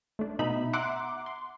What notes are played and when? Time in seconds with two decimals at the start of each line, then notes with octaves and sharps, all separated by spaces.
0.19 A3 D4
0.39 B2 D#4 E5 B5
0.73 E5 F#5 A#5 C6 D6
1.26 C6